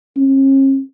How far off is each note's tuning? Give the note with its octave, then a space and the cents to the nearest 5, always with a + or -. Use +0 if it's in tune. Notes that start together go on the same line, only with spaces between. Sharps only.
C#4 -45